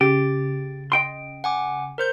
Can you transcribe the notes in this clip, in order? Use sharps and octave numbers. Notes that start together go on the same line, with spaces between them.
C#3 G4 A6
D#5 G5 C6
F#5 G#5 D6
A#4 C5 G6